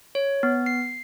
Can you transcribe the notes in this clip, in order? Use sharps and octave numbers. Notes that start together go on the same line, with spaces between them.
C#5
B3
C7